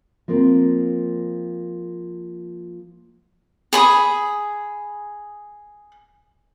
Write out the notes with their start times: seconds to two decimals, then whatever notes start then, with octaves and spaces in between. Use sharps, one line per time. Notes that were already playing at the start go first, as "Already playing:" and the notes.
0.28 F3 A#3 C4 A#4
3.73 G#4 B5 D#6